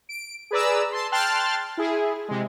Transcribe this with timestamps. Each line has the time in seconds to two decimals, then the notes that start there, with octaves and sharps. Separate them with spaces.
0.09 D7
0.51 G#4 B4 D5 A#5 E6
0.92 A5 C6
1.12 G5 A5 C6 F6 F#6 A6
1.77 E4 G#4
2.28 C3 G#3